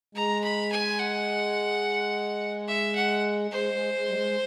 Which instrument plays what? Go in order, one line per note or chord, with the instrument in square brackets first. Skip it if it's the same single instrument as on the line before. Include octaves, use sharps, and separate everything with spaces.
[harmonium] G#3 [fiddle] A#5
[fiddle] B5
G#5
F#5
E5
F#5
[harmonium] G#3 [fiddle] C5
[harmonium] G#3
G#3
G3
G#3